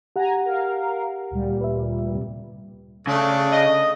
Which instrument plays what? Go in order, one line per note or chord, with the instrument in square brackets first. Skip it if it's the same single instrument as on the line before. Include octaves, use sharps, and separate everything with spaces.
[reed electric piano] G4 F#5 [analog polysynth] G#5 A#5
[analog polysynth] A#4 F5
D2 A#2 G3
[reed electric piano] B4 E5
F2 G#2 C3
[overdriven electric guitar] C#3 [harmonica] A3 D4 A4
[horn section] D#5